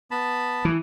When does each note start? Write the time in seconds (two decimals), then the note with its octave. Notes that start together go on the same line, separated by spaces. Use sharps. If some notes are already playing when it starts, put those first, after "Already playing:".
0.11 B3 A5 B5
0.65 E3